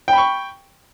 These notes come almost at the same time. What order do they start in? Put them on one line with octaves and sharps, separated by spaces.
G5 B5 C#6